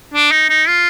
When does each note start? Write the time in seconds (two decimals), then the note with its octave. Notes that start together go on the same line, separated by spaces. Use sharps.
0.14 D4
0.32 D#4
0.49 D#4
0.68 F4